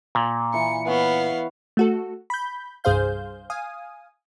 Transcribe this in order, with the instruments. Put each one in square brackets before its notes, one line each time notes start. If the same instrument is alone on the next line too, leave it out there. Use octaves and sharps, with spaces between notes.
[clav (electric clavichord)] A#2
[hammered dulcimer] E3 B4 [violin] C#7
[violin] B3 F5 [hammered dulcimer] B4 C#5 F#5
[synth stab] A3 F#4 A4
B5 G6
C2 G2 G#4 C5 F5 G6
F5 G#5 D#6